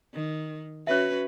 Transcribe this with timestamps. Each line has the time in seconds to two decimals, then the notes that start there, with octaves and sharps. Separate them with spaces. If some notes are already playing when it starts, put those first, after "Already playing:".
0.14 D#3
0.87 C#4 F#4 B4 C#5 E5